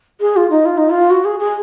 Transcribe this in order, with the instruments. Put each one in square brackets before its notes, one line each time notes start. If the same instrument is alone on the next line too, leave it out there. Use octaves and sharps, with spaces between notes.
[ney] G#4
F4
D#4
F4
D#4
F4
F#4
G#4
G#4